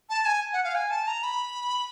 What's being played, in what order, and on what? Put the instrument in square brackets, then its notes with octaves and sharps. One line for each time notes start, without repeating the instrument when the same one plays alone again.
[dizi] A5
G#5
F#5
F5
G#5
A5
A#5
B5